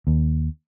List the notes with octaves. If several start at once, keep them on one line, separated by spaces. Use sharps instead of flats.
D#2